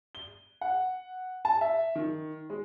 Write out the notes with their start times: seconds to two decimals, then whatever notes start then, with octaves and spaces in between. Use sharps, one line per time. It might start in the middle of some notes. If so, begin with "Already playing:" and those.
0.15 G7
0.61 F#5
1.45 A5
1.61 E5
1.95 D#3
2.50 G#3